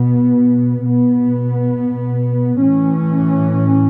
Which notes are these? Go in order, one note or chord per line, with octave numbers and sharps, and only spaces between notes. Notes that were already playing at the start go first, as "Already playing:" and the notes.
Already playing: B2 B3
B2 B3
A2 E3 C#4